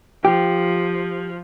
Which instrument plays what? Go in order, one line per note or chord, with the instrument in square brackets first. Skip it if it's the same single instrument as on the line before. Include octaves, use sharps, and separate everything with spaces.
[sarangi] F3 [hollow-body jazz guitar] G4